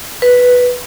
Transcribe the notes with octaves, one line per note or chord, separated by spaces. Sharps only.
B4